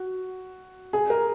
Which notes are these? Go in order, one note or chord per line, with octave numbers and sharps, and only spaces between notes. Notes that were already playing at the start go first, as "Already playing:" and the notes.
Already playing: F#4
G#4
A#4